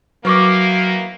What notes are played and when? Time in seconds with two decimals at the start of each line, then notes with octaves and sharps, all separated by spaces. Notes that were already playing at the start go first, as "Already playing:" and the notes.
0.25 D#3 E3 F#3 A#3 B4 C#6 D6